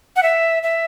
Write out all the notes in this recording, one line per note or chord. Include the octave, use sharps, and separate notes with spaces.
F#5
E5
E5